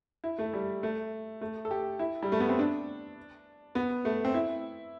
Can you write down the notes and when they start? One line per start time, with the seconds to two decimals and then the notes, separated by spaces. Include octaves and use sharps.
0.24 E4
0.38 A3
0.54 G3
0.83 A3
1.41 A3
1.65 A4
1.71 G4
1.99 E4
2.23 G3
2.32 A3
2.40 B3
2.49 C4
2.59 D4
3.75 B3
4.05 A3
4.25 C4
4.34 E4